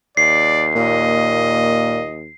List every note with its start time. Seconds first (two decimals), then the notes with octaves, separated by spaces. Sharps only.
0.17 D#2 D5 C7
0.76 A#2 D#5